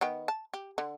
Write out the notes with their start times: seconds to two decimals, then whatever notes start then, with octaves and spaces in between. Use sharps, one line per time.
0.01 D#3 B3 G5
0.28 A5
0.54 G4
0.78 D3